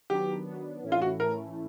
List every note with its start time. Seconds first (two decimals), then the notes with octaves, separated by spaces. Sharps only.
0.10 D#3 F#3 B3 D4 G4
0.46 D#3 F#3 B3 D4
0.82 A2 E3 A3 C#4 E4
0.92 F4
1.02 F#4
1.19 A2 E3 A3 C#4 E4 A#4